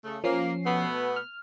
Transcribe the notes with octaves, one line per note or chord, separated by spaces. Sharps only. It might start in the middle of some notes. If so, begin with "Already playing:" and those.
C#3 A3
F3 A#3 C#4 C7
B2 A3 B3
F6